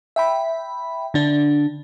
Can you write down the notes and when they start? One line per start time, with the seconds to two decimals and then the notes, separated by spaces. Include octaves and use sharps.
0.16 E5 G5 B5
1.14 D3 D4